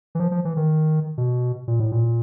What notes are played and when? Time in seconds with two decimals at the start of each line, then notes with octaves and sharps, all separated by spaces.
0.15 E3
0.20 F3
0.31 F3
0.45 E3
0.57 D#3
1.18 B2
1.68 A#2
1.80 A2
1.92 A#2